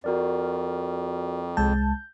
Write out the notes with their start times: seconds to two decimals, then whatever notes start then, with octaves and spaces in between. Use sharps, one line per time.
0.04 F2 F#4 A#4 D5
1.57 C2 G#3 A5 G6